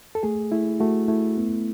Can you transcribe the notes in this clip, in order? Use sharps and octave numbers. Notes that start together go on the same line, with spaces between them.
A4
A3 G#4
A3 E4
A3 F#4
A3 E4
B3